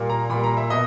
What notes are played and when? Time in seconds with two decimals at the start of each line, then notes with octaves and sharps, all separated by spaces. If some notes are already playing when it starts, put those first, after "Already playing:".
Already playing: A#2 G3 A#3
0.10 A#5
0.30 A#2 G3 A#3 B5
0.44 A#5
0.57 E5
0.70 B2 D#5